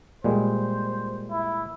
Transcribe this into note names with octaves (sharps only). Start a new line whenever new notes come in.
A#2 G3 G#3 C5
E4